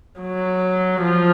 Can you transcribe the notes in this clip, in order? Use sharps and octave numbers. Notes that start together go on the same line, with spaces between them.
F#3
F3